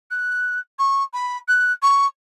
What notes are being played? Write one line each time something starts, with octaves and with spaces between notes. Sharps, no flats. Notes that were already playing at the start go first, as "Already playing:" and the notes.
F#6
C#6
B5
F#6
C#6